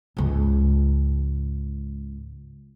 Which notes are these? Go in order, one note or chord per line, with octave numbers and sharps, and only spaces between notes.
C#2 G#2